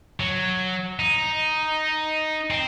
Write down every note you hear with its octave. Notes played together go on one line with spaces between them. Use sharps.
F#3
D#4
C4